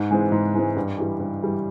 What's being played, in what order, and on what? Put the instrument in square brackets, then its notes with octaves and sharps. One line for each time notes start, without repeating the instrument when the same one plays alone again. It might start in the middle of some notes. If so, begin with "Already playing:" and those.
Already playing: [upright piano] G#2
E3 G#3 C4
G#2
E3 G#3 C4
G2
E3 G3
G2
E3 G3